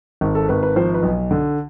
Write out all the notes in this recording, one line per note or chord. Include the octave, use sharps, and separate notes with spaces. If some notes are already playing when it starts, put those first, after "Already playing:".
G#1
A4
G#1 B4
B4
F3 C5
B4
B1
D3